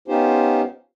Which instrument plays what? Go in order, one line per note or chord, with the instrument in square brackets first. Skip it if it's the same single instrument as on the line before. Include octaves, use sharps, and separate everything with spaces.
[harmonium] B3 C#4 D#4 F4 G4 C5